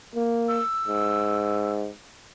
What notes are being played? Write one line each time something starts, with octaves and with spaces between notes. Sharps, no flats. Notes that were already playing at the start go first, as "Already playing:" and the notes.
A#3
E6
G#2